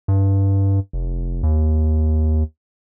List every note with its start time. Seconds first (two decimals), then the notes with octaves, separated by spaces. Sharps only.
0.08 G2
0.93 F1
1.43 D#2